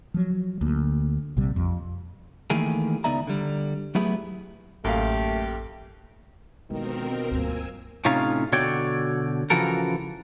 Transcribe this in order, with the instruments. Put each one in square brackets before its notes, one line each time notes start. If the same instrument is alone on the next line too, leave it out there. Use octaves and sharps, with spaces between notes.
[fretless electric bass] F3 F#3
D2 A#3
A#1 C3 G3
F2
[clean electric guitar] D#3 E3 A3 A#3 G4 G#4
C#2 B3 D#4 D5 E5 A#5
D3 G3
F#3 A3 B3 E4 G4 G#4
[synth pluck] A1 [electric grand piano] F#2 A#3 F5 [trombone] A3 [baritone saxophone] G4
[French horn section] F2 D3 D#3 [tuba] B2 [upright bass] G#3 [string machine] C4 A#4
[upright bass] D2 G2 [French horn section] F3 A#3 [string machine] G#5 E6
[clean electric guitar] A2 C3 C#4 D#4 F4 F5
B2 D3 F#4 C#5 D5 G5
C#3 E3 F3 F#4 A4 A#4